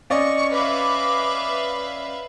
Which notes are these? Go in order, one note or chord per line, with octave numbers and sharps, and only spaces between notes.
C#4 D5 D#5 C#6
B4 E5 F5 D6